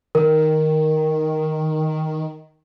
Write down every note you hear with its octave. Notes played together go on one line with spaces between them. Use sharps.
D#3 A#4